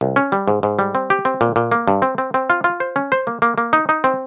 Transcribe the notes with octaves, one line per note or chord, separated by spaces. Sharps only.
C2
C#4
G3
G#2
G#2
G3
C4
G4
C4
A#2
A#2
A#3
G2
C4
C4
C4
F4
F4
C5
C#4
C5
A#3
A#3
A#3
D#4
D#4
C4